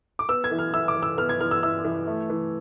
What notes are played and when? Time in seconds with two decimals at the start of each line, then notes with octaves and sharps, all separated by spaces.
0.19 D6
0.29 B3 E6
0.44 G#6
0.51 E3
0.59 F6
0.73 E4 E6
0.88 D6
0.96 E3
1.03 E6
1.18 B3 F6
1.29 G#6
1.40 E3 F6
1.51 E6
1.63 E4 E6
1.84 E3
2.07 A3
2.30 E3